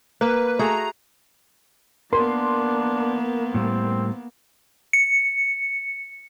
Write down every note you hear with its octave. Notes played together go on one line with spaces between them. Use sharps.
A#3 B4
A3 F#4 G#4 A#5
A#3 B3 D4 A#4 C6
A2 G3 C4
C#7